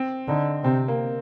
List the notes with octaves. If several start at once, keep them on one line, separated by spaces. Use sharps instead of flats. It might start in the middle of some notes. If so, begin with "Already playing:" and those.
Already playing: C4
D3 D#4
C3 C4
A#3